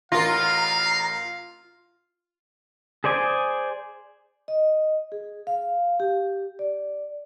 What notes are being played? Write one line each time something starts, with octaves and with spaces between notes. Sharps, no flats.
A1 F4 A#4 F5 A#5
G#4 C5 D5 G#5
D#5
G#4
F5
G4
D5